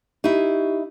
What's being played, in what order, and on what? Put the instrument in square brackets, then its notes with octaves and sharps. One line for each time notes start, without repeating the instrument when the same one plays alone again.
[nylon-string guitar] D#4 E4 [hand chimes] G4